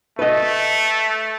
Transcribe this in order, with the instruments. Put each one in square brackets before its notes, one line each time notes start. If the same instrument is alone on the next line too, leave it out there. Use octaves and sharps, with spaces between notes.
[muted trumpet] A3 [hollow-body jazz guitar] B4 D#5